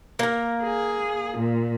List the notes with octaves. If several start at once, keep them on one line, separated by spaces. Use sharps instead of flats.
A#3 A#4
G#4
A#2